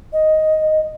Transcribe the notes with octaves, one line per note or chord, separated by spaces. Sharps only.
D#5